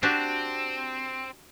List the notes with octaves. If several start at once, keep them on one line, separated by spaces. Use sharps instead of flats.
C4 D4 F#4 G4